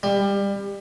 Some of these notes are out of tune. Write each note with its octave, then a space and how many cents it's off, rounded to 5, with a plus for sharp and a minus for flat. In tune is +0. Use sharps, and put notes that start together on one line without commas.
G3 +25